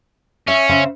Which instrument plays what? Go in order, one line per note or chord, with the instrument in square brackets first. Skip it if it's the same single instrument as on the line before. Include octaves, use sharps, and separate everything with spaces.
[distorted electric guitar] C#4 [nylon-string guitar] E5
[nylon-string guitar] C#3 C5 E5